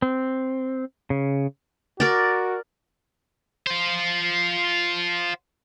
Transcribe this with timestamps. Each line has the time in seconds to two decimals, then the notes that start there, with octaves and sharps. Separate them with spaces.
0.02 C4
1.10 C#3
2.00 F#4 A#4 D5
3.67 F4 C5